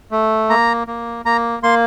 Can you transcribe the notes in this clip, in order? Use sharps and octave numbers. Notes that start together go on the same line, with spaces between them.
A3
A#3 A#5
A#3
A#3 A#5
A#3 C6